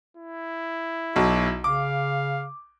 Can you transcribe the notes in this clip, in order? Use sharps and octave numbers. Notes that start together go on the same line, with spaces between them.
E4
B1 F#4
C#3 F5 D6